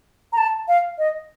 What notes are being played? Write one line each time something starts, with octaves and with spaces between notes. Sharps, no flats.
A#5
A5
F5
D#5